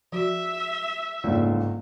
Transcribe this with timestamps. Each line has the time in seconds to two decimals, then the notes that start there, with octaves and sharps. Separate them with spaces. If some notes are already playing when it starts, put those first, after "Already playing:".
0.12 F3 F#4 E5
1.24 G1 C#2 G#2 D3 A#3 D5